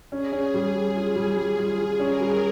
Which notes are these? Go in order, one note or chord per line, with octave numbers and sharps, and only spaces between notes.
C#4 G#4
C#4
G3
G3
F4
G3
G3 G#4
F4
F4
C#4 A#4
G3